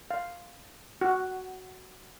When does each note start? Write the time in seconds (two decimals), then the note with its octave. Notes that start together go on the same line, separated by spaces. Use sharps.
0.11 F5
1.01 F#4